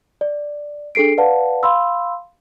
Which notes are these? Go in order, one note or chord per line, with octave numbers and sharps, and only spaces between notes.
D5
D4 G#4 A4 C7 D7
B4 D5 F5 F#5 A5
F5 B5 C6 E6